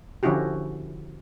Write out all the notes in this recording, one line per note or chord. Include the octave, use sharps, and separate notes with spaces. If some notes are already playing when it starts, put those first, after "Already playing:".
D3 F3 C#4 E4 F#4 G4